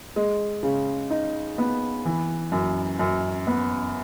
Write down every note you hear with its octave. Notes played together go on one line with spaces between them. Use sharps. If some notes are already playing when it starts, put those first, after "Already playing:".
G#3
C#3
D#4
B3
E3
F#2
F#2
B3